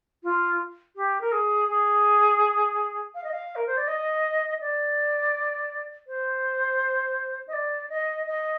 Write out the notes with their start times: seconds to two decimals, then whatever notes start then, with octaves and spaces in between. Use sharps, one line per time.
0.23 F4
0.96 G4
1.21 A#4
1.32 G#4
1.68 G#4
3.15 F5
3.24 D#5
3.32 F5
3.56 A#4
3.67 C5
3.77 D5
3.88 D#5
4.61 D5
6.07 C5
7.47 D#5
7.53 D5
7.89 D#5
8.26 D#5